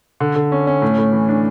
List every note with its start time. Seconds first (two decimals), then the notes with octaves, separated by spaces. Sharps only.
0.20 D3
0.35 D3
0.52 C#4
0.67 C#4
0.82 A2
0.98 A2
1.12 E3
1.29 D4